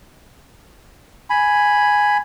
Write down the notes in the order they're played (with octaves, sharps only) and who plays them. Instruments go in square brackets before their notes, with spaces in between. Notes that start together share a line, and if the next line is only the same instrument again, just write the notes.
[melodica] G#5 B5